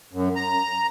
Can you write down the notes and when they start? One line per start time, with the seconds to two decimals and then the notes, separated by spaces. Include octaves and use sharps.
0.13 F#2
0.36 A#5